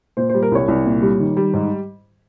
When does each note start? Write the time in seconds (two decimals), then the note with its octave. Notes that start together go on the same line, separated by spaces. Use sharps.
0.17 A#2 C5
0.29 C5
0.34 G3
0.43 A#4
0.52 C2 C#5
0.68 C2
0.86 A#2
1.02 G3
1.20 D#3
1.37 G3
1.54 G#2